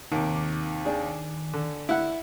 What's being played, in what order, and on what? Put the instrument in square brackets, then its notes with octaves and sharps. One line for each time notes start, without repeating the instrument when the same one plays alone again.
[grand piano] D#2 C3 [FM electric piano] D#3 D6
[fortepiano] D4 G#4
[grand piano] D3
[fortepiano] E4 F#5